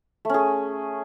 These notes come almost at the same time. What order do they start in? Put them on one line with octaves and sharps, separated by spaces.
A3 C#4 G#4